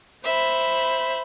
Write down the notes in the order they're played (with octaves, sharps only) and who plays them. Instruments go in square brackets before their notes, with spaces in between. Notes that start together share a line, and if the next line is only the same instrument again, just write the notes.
[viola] C5 B5 [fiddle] E5